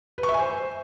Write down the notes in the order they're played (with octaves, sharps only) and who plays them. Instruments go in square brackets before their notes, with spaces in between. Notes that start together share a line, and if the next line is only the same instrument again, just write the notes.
[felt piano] B4
C#6
E5
G#5
C5